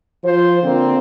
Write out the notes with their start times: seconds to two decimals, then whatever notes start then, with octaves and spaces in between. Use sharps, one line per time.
0.24 F3 F4 C5
0.63 D3 A#3 C4